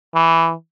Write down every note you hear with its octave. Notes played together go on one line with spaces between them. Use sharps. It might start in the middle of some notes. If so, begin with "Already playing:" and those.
E3